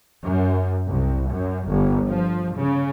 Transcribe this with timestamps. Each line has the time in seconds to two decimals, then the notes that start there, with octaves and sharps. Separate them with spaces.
0.25 F#2
0.88 C2
1.32 F#2
1.69 G1
2.08 F3
2.58 C#3